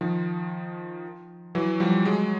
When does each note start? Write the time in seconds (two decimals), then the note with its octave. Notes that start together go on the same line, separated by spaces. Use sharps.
0.01 D#3 F3
1.55 E3 F#3
1.80 F3 G3
2.05 F#3 G#3